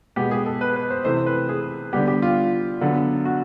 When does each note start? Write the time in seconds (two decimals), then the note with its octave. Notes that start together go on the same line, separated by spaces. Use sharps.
0.16 B2 G#3 B3 G4
0.31 G#4
0.46 A4
0.61 B4
0.76 B4
0.90 C5
1.05 C3 E3 A3 C5
1.26 B4
1.49 G#4
1.93 D3 G3 B3 G4
2.08 G4
2.22 F4
2.81 D3 F#3 B3
3.25 F#4